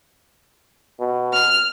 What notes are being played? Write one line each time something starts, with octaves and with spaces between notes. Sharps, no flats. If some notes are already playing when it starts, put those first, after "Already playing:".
B2
F6